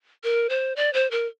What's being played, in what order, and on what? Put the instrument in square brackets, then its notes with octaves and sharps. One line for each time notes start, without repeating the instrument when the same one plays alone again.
[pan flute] A#4
C5
D5
C5
A#4